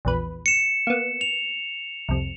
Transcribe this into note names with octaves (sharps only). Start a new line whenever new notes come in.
A#1 E2 B4
C#7 E7
A#3 B3
F7
C2 F2